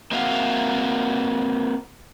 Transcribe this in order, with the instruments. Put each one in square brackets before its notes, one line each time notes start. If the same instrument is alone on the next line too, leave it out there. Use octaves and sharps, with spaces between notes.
[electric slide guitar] A#3 C4 F#4 E5 F5